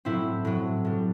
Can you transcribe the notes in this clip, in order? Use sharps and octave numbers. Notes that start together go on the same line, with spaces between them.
A2 F#3 C4 E4
A2 F#3
A2 G3